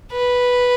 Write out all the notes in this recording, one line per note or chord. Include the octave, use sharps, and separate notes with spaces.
B4